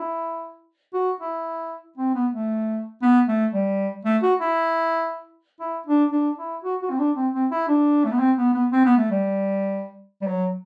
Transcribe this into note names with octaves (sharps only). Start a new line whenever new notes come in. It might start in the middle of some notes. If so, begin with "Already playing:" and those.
Already playing: E4
F#4
E4
C4
B3
A3
B3
A3
G3
A3
F#4
E4
E4
D4
D4
E4
F#4
F#4
C4
D4
C4
C4
E4
D4
A3
B3
C4
B3
B3
C4
B3
A3
G3
G3
F#3